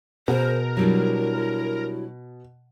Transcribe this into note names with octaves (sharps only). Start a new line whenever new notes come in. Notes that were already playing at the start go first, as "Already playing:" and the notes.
B2 G#4 A#4 C5
F#3 G3 D4 E4